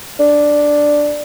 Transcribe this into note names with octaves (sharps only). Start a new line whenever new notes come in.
D4